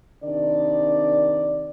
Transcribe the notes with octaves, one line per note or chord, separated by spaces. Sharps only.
C3 D#3 D4 D5